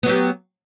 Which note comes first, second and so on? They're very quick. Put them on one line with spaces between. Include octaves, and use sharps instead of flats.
B3 F#3 G4